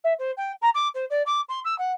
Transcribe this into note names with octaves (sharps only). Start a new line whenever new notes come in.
E5
C5
G5
A#5
D6
C5
D5
D6
C6
E6
F#5